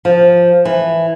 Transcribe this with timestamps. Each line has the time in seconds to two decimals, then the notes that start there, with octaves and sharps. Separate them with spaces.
0.05 F3
0.65 E3